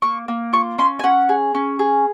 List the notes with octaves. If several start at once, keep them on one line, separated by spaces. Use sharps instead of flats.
A#3 C#6
A#3
F4 C#6
C#4 C6
G#5
C#4 F#5
G#4
C#4
G#4